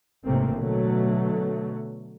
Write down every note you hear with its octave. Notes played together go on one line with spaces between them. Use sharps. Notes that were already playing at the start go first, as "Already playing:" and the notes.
A1 G#2 C3 A3 A#3 C4
B2 D3 F#3 A3